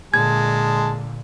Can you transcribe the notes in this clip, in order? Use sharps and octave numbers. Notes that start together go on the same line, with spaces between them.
A#2 D3 G#3 A5 G#6